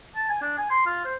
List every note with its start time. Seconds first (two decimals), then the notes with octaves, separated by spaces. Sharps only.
0.16 A5
0.29 G#5
0.42 D4
0.58 G#5
0.70 C6
0.86 F4
1.05 C5